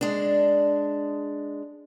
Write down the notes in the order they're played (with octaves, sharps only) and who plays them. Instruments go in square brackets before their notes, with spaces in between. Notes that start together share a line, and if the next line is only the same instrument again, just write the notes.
[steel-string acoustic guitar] G#3 D4